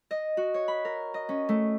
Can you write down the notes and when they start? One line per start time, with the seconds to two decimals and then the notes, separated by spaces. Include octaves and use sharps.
0.11 D#5
0.37 F#4
0.54 C#5
0.68 B5
0.85 A#4
1.14 D#5
1.29 C#4
1.49 A3